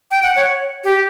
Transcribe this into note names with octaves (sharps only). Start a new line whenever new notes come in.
G5
F#5
C#5
G4